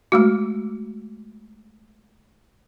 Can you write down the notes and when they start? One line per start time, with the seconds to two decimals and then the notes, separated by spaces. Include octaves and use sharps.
0.12 G#3 A3 F#4